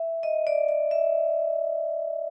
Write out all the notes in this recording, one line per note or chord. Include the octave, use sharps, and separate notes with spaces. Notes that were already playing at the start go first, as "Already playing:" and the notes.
Already playing: E5
D#5
D5
D5
E5